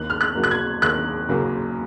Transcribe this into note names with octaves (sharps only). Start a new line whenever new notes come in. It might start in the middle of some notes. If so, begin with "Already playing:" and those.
Already playing: D#2 F#6
F6
F#6
C#3 F#3 A#3
F#6
G#6
D#2 F#6
C#3 F#3 A#3